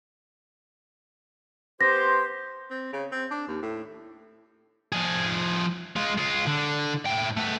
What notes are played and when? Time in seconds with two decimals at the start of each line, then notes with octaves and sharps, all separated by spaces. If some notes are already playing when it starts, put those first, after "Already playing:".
1.81 B3 G4 C5 A#6
2.71 C4
2.93 C#3
3.12 C4
3.31 D4
3.48 D#2
3.63 A2
4.92 F3 G#4
5.96 G#3 F4
6.18 G#3 F4
6.47 D3
7.06 A2 G5
7.37 A3 B3